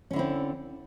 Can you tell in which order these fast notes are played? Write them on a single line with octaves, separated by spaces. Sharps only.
C#4 D3 E4 C4